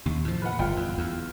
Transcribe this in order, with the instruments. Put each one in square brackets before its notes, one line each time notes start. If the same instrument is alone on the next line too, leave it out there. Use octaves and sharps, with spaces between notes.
[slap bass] D#2 C3
A2 F3
[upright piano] B4 F#5
[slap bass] G1 [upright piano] F4 G5
[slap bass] E2
E2